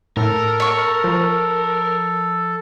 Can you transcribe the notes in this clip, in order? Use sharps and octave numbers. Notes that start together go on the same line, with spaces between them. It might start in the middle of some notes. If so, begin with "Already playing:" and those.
A2 A4 A#4
C#5 C#6
F3